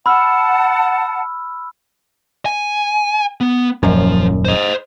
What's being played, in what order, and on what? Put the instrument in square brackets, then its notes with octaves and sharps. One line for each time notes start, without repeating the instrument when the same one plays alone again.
[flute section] F#5 A5 [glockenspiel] B5 E6 F6
[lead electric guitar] G#5
B3
[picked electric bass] D#1 F#2 [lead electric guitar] F3
[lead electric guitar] C5 D#5